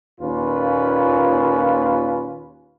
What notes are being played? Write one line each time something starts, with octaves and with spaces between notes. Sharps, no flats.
D#2 A#2 C#4 F4 B4